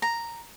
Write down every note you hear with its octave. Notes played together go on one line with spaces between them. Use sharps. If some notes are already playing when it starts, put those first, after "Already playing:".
A#5